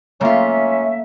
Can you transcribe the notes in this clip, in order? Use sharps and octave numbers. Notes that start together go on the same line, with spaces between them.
G#2 A3 A#3 C#4 F4 E5